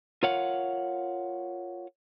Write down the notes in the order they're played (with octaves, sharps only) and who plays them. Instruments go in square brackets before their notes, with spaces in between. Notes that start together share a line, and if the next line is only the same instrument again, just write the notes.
[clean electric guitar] F4 A#4 C#5 F5 F#5